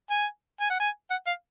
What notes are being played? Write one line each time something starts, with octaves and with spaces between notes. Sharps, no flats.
G#5
G#5
F#5
G#5
F#5
F5